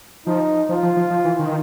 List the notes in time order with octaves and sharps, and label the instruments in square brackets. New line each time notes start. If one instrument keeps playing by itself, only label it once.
[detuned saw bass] F3 [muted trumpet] D#4
[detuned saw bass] F3 [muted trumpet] F4
[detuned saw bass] F3
F3
F3
E3
D#3